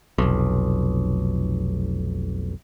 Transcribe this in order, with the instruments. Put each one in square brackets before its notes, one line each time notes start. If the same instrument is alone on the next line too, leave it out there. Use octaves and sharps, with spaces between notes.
[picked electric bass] F1 B1